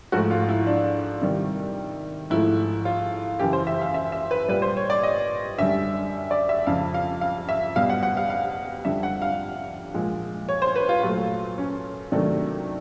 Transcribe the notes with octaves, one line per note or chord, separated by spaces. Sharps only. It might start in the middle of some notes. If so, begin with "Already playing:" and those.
G#2 F3 A3 F#4
F4
E4
D4
C3 D#3 G3
G#2 F3 A3 E4
F4
F#2 C#3 E3 G4
C5
E5
F5
E5
E5
B4
A#2 G3 B4
C5
C#5
D5
D#5
F#2 D3 G3 E5
D5
E5
F2 C#3 F3 F5
F5
F5
E5
B2 G3 F5
F#5
F#5
F5
F5
F2 D3 G3 E5
F#5
F5
A#2 F3 G#3
C#5
C5
B4
F4
A#2 F#3 A3 F4
C#4
C3 D#3 F#3 A3 D4